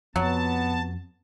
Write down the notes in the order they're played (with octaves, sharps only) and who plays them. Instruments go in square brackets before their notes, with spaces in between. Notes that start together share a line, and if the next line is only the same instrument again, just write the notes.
[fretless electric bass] F2 [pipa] F#3 [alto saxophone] B3 [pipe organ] A5